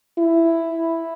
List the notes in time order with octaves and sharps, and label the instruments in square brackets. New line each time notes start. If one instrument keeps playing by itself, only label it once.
[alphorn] E4